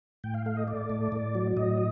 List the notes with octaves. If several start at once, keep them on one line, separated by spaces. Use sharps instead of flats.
A2 G5
F5
A3 F5
D#5
A3 D5
A2
A2
F#3
A2 D#5